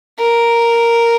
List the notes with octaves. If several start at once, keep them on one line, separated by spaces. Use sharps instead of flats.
A#4